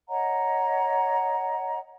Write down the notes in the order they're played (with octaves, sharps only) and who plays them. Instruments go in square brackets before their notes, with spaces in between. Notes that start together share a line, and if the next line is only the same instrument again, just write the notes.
[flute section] C#5 D#5 F#5 A#5